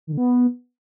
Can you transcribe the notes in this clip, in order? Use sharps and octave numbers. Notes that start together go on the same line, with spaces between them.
D#3
D3
B3